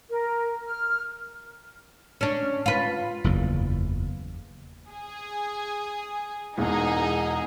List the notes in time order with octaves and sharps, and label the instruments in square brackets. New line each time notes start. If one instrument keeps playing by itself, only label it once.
[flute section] A#4
F6
[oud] C#4 D4
F4 B4
[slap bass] F#1 E2 E3
[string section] G#4
[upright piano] E1 E2 [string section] D#4 G#4